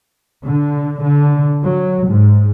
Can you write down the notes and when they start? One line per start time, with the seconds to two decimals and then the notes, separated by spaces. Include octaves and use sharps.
0.46 D3
1.05 D3
1.65 F#3
2.09 G#2